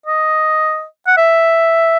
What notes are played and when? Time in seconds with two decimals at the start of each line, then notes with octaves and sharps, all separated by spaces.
0.06 D#5
1.07 F#5
1.17 E5